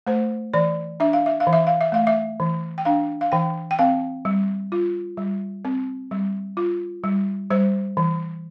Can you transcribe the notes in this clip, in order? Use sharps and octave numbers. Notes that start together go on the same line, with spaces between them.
A3 C5
E3 D5
D4 E5
F5
E5
F5
E3
E5
F5
E5
A3 F5
E5
E3
G5
D4 F5
F5
E3 G5
G5
C4 F5
G3
F4
G3
C4
G3
F4
G3
G3 C5
E3